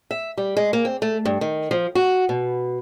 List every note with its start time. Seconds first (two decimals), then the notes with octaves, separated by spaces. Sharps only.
0.11 E5
0.38 G3
0.57 G#3
0.73 A#3
0.85 C4
1.02 A3
1.25 G2
1.41 D#3
1.71 F3
1.95 F#4
2.29 B2